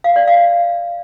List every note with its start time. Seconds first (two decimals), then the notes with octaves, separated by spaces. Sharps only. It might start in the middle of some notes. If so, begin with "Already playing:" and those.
0.04 F5
0.16 D5
0.27 F5